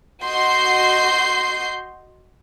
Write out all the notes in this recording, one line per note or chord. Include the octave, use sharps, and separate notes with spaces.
F#4 D#5 C6 G6 C7